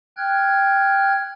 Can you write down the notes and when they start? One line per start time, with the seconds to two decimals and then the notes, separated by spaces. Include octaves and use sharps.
0.17 G5 F6 F#6 G#6